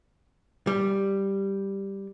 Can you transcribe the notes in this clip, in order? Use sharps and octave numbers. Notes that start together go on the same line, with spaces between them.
G3